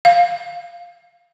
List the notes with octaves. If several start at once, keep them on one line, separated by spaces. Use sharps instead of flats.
F5